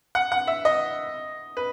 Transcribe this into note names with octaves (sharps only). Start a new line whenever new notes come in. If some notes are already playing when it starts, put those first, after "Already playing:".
F#5
F#5
E5
D#5
B4